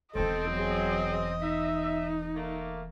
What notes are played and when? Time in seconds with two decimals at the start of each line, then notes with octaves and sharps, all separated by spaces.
0.15 E1 E2 C4 A4 D#5
0.51 F#3 G#4
1.41 D#4 E5
2.35 A3 A#3